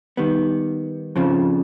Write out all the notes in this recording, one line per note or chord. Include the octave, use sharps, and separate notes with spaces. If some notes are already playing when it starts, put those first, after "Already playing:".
D#3 G3 B3
F2 C#3 F3